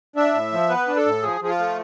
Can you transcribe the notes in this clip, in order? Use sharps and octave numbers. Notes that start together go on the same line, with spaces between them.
D4 E5
A2
F3
B3 B4
D4
A4
A2
F3 G#4
F3 G#4
F4
A3